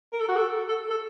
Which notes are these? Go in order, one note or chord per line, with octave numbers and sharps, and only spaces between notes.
A#4
A4
F#4
A4
A4
A4